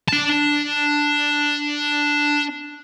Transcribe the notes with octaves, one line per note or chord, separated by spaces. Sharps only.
D4 A5